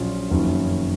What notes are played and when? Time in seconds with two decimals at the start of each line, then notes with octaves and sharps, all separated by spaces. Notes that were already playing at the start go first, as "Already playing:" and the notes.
Already playing: A#1 A#2 F#3 C#4 F4
0.30 F#1 F2 D#3 F#3 C#4